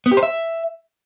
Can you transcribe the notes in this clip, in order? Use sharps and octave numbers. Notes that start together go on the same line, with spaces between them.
B3
G4
C5
E5